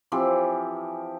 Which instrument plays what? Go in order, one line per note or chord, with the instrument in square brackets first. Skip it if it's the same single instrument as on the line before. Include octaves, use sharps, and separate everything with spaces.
[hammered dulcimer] E3 F3 C4 G4